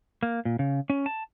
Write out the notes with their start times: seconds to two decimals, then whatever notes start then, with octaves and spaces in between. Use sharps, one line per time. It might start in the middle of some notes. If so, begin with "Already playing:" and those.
0.23 A#3
0.45 A#2
0.59 C#3
0.90 C#4
1.06 A5